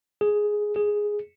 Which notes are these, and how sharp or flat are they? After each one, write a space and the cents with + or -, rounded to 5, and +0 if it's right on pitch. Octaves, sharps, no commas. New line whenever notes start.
G#4 +5
G#4 +0